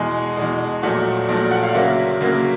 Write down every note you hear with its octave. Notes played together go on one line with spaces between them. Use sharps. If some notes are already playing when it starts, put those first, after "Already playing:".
Already playing: E2 B2 G#3 G#5
E2 B2 G#3
A#1 A#2 F#3 A3 F#5
A#1 A#2 F#3 A3
F#5
F5
D2 C#3 F#3 A#3 E5
D2 C#3 F#3 A#3